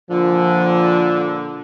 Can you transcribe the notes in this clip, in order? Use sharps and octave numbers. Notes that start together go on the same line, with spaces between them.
A#2 D3 F3